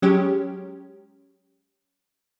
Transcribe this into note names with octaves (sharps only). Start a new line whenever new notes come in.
F#3 G#3 C#4 G4